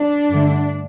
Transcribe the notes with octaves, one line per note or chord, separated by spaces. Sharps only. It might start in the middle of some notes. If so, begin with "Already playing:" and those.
Already playing: D4
G2 D3 A3